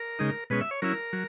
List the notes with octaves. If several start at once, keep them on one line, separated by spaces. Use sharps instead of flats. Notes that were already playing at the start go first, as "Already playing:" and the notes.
Already playing: A#4
C#3 G#3 D#4
B2 G#3 C#4 B4
E5
C#5
F#3 C#4 E4 A#4
F#3